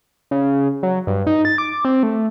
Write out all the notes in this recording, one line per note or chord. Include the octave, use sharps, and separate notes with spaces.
C#3
F#3
G2
D#4
A6
D6
C4
A3